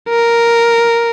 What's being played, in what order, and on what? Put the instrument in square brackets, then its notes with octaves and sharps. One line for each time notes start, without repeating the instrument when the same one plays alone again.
[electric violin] A#4